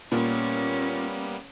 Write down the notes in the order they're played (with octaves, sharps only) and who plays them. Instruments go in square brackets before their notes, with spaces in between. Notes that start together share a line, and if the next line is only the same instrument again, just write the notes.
[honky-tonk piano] A#2 [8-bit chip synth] G3 A#3 B3 [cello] C#4